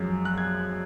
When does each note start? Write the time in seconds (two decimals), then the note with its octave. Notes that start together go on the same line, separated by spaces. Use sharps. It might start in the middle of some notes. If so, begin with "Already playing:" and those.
Already playing: F#2 F3 G#3
0.25 F#6
0.38 G#6